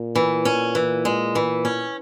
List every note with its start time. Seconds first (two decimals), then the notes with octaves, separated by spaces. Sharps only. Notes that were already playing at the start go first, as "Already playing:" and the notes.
Already playing: A#2
0.15 E3
0.45 C#4
0.75 E3
1.05 G#3
1.35 E3
1.65 C#4